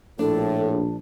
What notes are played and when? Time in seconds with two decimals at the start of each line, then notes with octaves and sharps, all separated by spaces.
0.19 A#1 A2 D4 A4